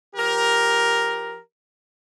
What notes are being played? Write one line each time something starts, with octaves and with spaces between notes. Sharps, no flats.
F3 G4 A#4